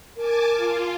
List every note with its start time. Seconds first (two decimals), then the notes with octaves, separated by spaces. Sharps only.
0.17 A#4 G#5 A5 D6
0.57 F4